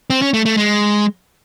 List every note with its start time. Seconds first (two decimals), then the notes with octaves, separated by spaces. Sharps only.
0.10 C4
0.22 C#4
0.34 A3
0.46 A3
0.57 G#3